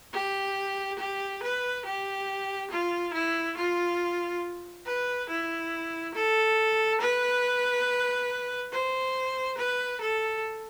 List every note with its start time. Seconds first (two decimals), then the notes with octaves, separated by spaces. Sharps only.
0.14 G4
0.99 G4
1.43 B4
1.85 G4
2.71 F4
3.14 E4
3.57 F4
4.86 B4
5.30 E4
6.15 A4
7.01 B4
8.73 C5
9.58 B4
10.01 A4